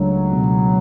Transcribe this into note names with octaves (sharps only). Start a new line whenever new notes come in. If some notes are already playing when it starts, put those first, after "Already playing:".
Already playing: C#2 F#3 A3 D4
B2